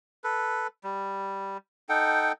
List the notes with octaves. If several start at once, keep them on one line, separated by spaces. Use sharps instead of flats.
A4 B4
G3
D#4 A4 F#5 G5